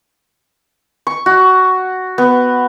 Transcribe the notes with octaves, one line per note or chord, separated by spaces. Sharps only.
C#6
F#4
B3